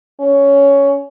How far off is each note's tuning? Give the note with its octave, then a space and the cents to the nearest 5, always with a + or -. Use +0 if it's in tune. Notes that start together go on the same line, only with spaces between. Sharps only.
C#4 +10